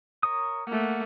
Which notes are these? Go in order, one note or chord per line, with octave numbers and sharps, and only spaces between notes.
A#4 C#5 D#6
A3 A#3 F#5